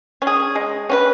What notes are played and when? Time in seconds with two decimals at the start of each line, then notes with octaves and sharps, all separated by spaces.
0.22 C#4
0.27 G#4
0.55 G#3
0.89 C#4 F#4 B4